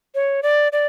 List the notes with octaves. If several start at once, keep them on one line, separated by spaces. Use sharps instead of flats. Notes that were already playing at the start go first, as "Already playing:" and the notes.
C#5
D5
D5